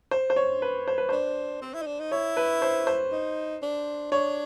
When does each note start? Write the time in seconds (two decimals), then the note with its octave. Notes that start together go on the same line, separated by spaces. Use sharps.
0.11 C5
0.30 C5
0.36 C#5
0.62 B4
0.88 C5
0.98 B4
1.09 D4 C5
1.62 C4
1.74 E4
1.82 D#4
1.87 D4
2.00 D#4
2.12 E4 C#5
2.37 B4
2.62 C5
2.87 C5
3.12 D#4
3.62 D4
4.12 D4 C#5